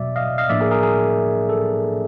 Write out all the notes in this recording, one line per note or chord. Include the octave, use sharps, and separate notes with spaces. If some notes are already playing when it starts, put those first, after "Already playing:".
Already playing: E2 B2 F#3 D5 E5
D#5 F5
D#5 F5
A2 F3 A#3 D4 D5 E5
G#4 A#4
G#4 A#4
G#4 A#4
A4